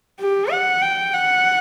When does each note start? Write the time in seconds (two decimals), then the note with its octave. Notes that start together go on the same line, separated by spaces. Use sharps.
0.20 G4
0.51 F#5
0.82 G5
1.14 F#5